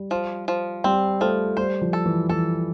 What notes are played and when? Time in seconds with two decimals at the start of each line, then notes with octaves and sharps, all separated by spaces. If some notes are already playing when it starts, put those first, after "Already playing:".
Already playing: G3
0.11 F3
0.48 F3
0.84 G3 C4
1.21 F3 A3
1.57 G3 C5
1.81 F3
1.93 A4
2.06 E3
2.29 E3 A4